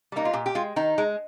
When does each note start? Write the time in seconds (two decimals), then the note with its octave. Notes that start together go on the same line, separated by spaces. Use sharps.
0.12 G3 A#3 D#4
0.25 F4
0.33 A#2 G4
0.46 G4
0.55 G#3 F4
0.76 D#3 D#4
0.98 G#3